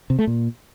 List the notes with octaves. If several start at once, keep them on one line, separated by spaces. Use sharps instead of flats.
C3
A3
A#2